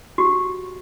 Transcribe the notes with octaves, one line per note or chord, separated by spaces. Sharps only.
F#4 G4